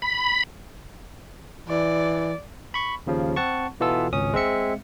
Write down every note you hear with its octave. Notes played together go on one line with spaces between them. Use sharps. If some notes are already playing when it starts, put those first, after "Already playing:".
B5
E3 D5
B5 C#6
D#2 C#3 F3
C4 F#5 A5 C#6
B2 E3 B3 F4 A4 E6
G#1 C#2 C#4 D#6
G#3 C4 E5 C#7